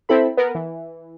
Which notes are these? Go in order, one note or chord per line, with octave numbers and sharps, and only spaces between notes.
C4 E4 A4 B5
B3 A#4
E3